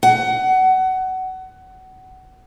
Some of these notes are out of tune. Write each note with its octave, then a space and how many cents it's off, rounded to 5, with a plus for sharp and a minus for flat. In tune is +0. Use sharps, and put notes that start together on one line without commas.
F#5 +20